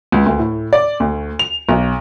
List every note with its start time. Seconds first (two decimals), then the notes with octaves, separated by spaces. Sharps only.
0.12 C#2
0.26 D2
0.39 A2
0.73 D5
1.00 D2
1.39 F7
1.69 B1